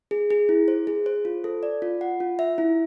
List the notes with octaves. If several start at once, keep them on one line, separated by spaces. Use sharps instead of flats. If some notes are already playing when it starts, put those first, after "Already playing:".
G#4
G#4
E4
C5
G#4
C5
F4
A4
D5
F4
F#5
F4
E5
E4